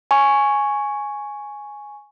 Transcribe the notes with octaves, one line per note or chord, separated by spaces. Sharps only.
G#5 C#6